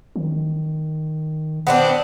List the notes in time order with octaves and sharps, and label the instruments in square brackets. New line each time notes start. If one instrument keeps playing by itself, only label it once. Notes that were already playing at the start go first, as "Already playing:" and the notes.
[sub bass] D#3
[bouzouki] B3 C4 D4